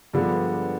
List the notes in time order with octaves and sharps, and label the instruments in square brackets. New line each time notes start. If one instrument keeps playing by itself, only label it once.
[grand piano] G2 D3 F3 G#3 B3